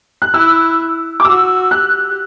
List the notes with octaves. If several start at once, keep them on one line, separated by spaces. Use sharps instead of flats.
F#6
E4 E6
D6
F#4 E6
G4 F#6